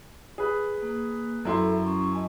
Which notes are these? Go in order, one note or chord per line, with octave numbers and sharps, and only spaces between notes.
G#4 B4
A#3
F#2 E4 A4 E5 C6
C#4 C#6
D#5 G#5 A5